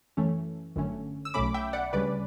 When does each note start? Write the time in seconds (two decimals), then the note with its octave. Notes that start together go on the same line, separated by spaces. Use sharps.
0.17 F#2 E3 A3 C#4
0.76 G1 F#2 D3 A3 C#4
1.25 E6
1.34 B1 B2 A3 C#4 B5 D6
1.54 E5 G5
1.73 D5 F#5
1.93 D2 C#3 G3 C#4 B4 D5